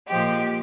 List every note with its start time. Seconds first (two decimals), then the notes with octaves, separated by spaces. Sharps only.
0.08 A#2 F3 G#3 G4